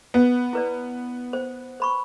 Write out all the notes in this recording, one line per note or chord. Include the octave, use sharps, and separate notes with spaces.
B3
E4 B4 D5
C5
C5 B5 C#6